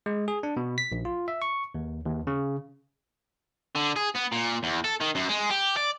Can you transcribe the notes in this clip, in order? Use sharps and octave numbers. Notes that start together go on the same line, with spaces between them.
G#3
G#4
D4
B2
B6
A#1
F4
E5
C#6
D#2
D#2
C#3
D3
G#4
B3
A#2
E2
A4
D#3
F#2
G#3
G4
D5